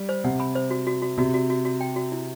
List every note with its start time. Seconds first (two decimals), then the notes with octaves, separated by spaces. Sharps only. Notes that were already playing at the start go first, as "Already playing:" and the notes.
Already playing: G3
0.09 C5
0.24 C3 F#5
0.40 B5
0.55 C5
0.71 F#4
0.87 F#4
1.02 F#4
1.18 C3 F#4
1.34 F#4
1.50 F#4
1.65 F#4
1.81 G5
1.96 F#4
2.12 E4